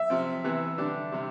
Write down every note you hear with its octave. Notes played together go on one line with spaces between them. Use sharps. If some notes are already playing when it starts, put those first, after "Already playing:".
Already playing: E5
C3 F3 C4
C3 E3 B3
D3 G3 D4 G4
C3 G3